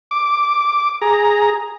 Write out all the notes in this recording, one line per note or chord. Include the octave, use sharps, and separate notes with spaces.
D6
G#4 A#5